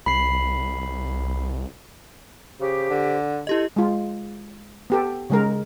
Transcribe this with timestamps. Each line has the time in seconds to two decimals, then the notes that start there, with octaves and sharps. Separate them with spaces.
0.06 C2 B5 C7
2.60 C#3 G4 C5 D6
2.90 D3
3.47 E4 G4 A4 D#5
3.76 G#3 F4
4.90 B3 G4 A4
5.30 C#3 G#3 A#4